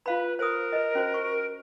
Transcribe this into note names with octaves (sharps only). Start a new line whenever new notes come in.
F4 B4 F5 B5
A#4 C5 D#6
B4 D#5
C#4 F#4 C5
C#6